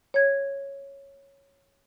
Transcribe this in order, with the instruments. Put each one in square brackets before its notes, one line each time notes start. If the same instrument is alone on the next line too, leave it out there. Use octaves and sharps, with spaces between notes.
[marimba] C#5 G#6